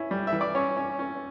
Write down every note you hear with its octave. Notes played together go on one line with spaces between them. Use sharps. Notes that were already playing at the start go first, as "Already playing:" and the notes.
Already playing: C#4 E4
G3
E5
E3
D5
C#4 C#5
C#4
C#4